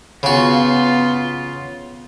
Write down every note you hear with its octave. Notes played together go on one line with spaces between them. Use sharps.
C#3 B3 F4 F#4